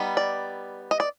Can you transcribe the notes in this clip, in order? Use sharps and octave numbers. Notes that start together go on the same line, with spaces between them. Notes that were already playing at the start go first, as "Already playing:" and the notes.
Already playing: G3 B3 D#4
D5
D#5
D5